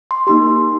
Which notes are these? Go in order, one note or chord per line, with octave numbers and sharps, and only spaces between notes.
C6
A#3 D#4 G4 C6